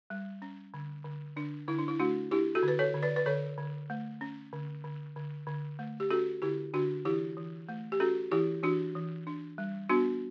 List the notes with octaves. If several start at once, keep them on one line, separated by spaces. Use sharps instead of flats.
G3
C#4
D3
D3
D3 D4
D3 E4
D4
E4
A3 D4 F#4
D4 E4 G4
F#4 A4
D3
B4
A4 C#5
D3
B4 D5
B4
D3 A4 C#5
D3
A3
C#4
D3
D3
D3
D3
A3
G4
C#4 F#4 A4
D3 E4 G4
D3 D4 F#4
E3 E4 G4
E3
A3
G4
C#4 F#4 A4
E3 E4 G4
E3 D4 F#4
E3
D4
G3
B3 D4 F#4